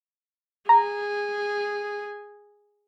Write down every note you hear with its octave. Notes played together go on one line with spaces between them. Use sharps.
G#4 A#5